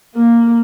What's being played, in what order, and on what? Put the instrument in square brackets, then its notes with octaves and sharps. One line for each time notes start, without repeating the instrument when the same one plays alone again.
[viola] A#3